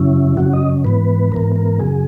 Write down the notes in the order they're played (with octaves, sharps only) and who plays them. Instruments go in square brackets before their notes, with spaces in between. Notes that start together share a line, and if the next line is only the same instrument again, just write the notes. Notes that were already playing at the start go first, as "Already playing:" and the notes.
Already playing: [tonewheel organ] F#2 C#3 F#3 C#4 E4
F#2 C#3 F#3 C#4 F#4
D#5
G#2 E3 B3 B4
G#2 E3 B3 A#4
A#4
F#2 C#3 F#3 G#4